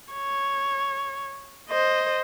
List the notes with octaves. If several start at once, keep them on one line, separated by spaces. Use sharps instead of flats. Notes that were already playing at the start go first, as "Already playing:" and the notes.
C#5
C5 D#5